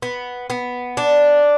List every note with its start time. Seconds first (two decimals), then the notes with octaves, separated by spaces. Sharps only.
0.02 B3
0.50 B3
0.97 D4